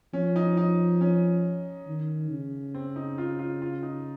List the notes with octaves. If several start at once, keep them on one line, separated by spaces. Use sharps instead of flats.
F3 C#4
D#4
D#4
C#4
D#3
C#3
C4
D#4
F4
F4
F4
D#4